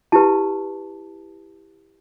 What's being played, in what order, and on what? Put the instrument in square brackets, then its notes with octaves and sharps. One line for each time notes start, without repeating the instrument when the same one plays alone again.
[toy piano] E4 G4 B4 A5